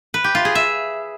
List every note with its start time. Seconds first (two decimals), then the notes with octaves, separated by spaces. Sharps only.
0.14 B4
0.24 G4
0.35 F4
0.45 G#4
0.55 E5